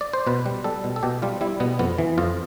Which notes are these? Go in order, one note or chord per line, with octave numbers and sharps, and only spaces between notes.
D5
C5
B2 B4
G3
G3 A4
B2
A4
B2 G4
G3 F4
G3 E4
B2 B3
F2 B3
E3
F2 F4